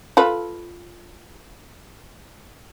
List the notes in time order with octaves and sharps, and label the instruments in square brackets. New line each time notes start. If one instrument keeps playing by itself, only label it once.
[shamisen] F4 A4 B4